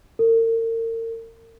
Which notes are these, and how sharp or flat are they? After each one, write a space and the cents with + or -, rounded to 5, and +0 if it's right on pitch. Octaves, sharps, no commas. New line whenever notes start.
A#4 -40